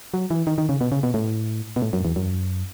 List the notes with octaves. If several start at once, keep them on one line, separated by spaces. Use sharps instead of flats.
F#3
E3
D#3
D#3
C#3
B2
C#3
B2
A2
B2
A2
F#2
E2
F#2